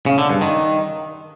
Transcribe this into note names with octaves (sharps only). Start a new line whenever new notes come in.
C#3
D3
G2
D#3